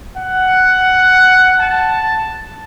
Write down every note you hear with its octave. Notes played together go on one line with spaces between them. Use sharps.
F#5
A5